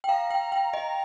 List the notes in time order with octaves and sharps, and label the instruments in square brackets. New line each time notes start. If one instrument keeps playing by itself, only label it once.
[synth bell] G5
[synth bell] F5 [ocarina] A#5
[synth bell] G5
G5
D#5